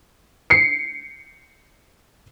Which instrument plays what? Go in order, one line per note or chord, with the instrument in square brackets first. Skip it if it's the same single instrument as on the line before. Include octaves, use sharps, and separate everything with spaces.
[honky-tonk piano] C7 C#7